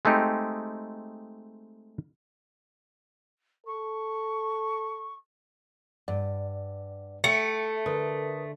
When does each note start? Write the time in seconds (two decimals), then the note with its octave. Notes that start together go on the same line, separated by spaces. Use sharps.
0.05 G#3 A3 C4 D#4 G4
3.67 A4 C#6
6.08 G2 D5 F#5
7.24 A3 E5 G5 C#7
7.86 D3 A#4 B4 D#6